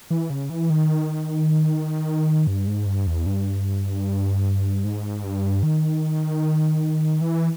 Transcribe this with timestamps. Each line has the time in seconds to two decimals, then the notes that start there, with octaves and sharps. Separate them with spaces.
0.10 E3
0.30 C#3
0.50 E3
0.70 D#3
2.47 G2
2.67 G#2
2.86 G2
3.07 E2
3.26 G2
4.85 G#2
5.24 G2
5.63 D#3
7.21 E3